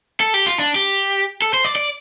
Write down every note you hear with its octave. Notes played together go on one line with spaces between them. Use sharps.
A4
G4
F4
D4
G4
A4
C5
D5
D5